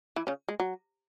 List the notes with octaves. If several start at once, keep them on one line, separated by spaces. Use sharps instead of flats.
E3 E4
C#3 C#4
G#3
F#3